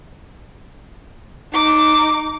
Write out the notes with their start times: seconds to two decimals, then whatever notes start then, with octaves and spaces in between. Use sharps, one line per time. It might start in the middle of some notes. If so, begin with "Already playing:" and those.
1.52 D#4 D6